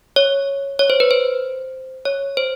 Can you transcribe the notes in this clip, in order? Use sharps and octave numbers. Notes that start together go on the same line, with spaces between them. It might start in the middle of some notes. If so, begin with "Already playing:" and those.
C#5
C#5
C5
B4
C5
C#5
C5